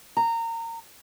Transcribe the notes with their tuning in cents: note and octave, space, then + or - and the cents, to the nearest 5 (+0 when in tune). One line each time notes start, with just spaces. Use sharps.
A#5 -25